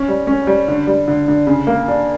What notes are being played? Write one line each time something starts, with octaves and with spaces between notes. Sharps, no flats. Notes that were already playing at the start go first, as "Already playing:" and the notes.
Already playing: C#4
G3
C#4
G3
D3
G3
D3
D3
C#3
A#3
D4